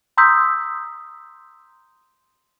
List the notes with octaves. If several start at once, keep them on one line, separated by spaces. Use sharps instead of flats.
A#5 C6 D#6 E6 G6 B6